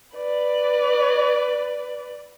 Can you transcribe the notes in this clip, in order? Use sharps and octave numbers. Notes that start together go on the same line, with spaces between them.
B4 D5